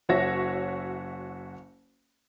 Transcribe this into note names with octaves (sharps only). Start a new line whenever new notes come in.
F#1 F#4 C#5 E5 A#6